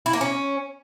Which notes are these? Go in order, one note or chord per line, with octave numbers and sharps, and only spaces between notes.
E4
A#3
C#4